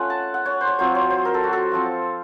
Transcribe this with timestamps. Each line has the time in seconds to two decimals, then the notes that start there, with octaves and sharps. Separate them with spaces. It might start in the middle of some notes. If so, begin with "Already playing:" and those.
Already playing: A3 C#4 F4 F#5
0.10 A5
0.34 F#5
0.45 C#5
0.61 C5
0.67 C#5
0.79 F#3 C4 F4 C5
0.95 C#5
1.10 C5
1.25 A#4
1.34 A4
1.43 F#4
1.53 A4
1.71 F3 C4 F4